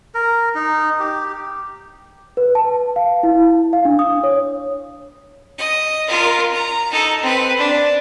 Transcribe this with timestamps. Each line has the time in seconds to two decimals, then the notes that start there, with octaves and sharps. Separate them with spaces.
0.15 A#4
0.55 D#4
1.00 G4
2.37 B4
2.55 A5
2.96 F5
3.23 E4
3.73 F5
3.85 D4
3.99 D#6
4.23 C#5
5.58 D#5
6.08 F4 A#4
6.53 A#5
6.92 D#4 A4
7.22 C4 B4
7.58 D4